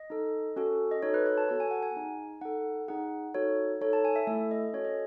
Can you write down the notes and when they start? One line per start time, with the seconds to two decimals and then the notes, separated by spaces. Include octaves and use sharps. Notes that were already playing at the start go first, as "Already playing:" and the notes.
Already playing: D#5
0.10 D#4 A4
0.56 C#4 F#4 A4
0.91 D#5
1.02 D#4 F#4 A4 C#5
1.14 B4
1.26 C#5
1.38 A5
1.49 B3 F#4 A4 A5
1.60 G#5
1.71 F#5
1.83 G#5
1.95 D#4 G#4
2.41 D#4 A4 F#5
2.88 D#4 G#4 F#5
3.34 D#4 F#4 A4 C#5
3.81 D#4 A4 C#5
3.93 A5
4.05 G#5
4.16 E5
4.27 A3 E4 A4 E5
4.51 D#5
4.73 C#4 F#4 A4 C#5
4.84 D#5